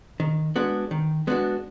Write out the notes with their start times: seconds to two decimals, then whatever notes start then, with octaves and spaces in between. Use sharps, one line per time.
0.20 D#3
0.56 G#3 B3 D4 F#4
0.91 D#3
1.27 G#3 B3 D4 F#4